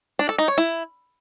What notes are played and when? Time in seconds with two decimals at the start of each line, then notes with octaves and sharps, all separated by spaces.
0.19 D4
0.29 A4
0.38 D#4
0.48 C#5
0.58 E4